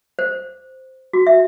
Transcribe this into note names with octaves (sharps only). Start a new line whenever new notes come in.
C5
F#4
E5